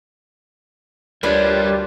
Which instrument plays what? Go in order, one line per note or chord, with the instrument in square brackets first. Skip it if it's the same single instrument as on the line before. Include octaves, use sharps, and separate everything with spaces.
[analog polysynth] D2 F4 G4 [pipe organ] G3 [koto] D4 B4 [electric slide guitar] A#4 C#5